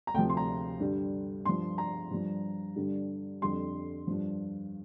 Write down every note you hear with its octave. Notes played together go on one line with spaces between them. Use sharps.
A#5
D2 C3 F3 G5
C6
A#5
G2 D3 G3
G2 F3 C6
A#5
G2 F3
G2 D3 G3
F2 D3 G3 C6
G2 F3